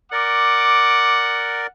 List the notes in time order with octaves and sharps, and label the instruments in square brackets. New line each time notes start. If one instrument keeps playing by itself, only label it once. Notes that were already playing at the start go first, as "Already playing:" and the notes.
[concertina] A#4 D5 [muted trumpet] F#5 [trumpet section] D6